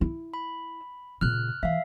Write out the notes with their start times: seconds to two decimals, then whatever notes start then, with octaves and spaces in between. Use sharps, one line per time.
0.01 E4
0.34 B5
1.21 A#2 C#3 F6 F#6
1.63 E3 E5 F5